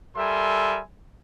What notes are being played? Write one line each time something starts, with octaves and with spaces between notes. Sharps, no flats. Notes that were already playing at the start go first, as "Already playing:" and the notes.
G3 A4 A#4 E5 G#5 C6